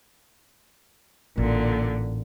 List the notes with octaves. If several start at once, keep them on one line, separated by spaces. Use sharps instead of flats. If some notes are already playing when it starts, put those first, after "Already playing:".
A1 A#2 D3